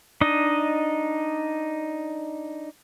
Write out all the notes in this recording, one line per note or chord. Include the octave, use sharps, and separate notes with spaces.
D4 D#4 D#5